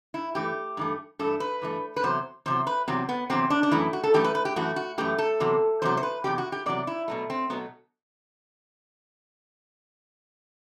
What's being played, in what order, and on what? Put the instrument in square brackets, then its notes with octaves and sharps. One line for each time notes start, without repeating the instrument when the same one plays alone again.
[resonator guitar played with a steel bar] E4
G2 E3 A3 G4
G2 E3 A3
G2 E3 A3 A4
B4
G2 E3 A3
B4
E2 C3 F#3 C5
E2 C3 F#3 C5
B4
E2 C3 F#3 C4
B3
E2 C3 F#3 C4
D4
D4
F#2 E3 A3 E4
F#4
A4
F#2 E3 A3 G4
B4
B4
G4
F#2 E3 A3 F#4
F#4
F#2 E3 A3 G4
A4
E2 C3 F#3
E2 C3 F#3 C5
C5
B4
E2 C3 F#3 G4
F#4
G4
E2 C3 F#3 D5
E4
B2 F#3 A3
C4
B2 F#3 A3 B3